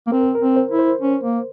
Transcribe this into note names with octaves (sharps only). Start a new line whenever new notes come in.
A#3
C4 A#4
A#4
C4
C5
E4
C5
C#4
A#3